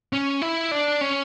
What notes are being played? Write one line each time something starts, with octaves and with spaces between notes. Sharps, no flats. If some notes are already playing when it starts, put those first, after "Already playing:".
C#4
E4
D4
C#4